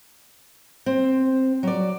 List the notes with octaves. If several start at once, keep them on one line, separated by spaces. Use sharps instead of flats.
C4
F#3 D5